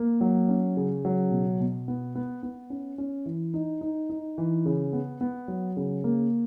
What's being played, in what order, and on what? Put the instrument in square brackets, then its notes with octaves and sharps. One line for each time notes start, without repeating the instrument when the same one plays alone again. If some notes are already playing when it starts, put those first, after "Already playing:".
Already playing: [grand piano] A#3
F#3
C#4
C#3
F#3
B2
B2
B3
B3
B3
C#4
C#4
E3
D#4
D#4
D#4
E3
C#3
B3
B3
F#3
C#3
A#3